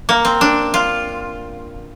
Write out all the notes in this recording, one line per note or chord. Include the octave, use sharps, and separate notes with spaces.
A#3
C4
D4
F4